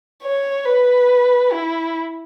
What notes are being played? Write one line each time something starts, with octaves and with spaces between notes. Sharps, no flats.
C#5
B4
E4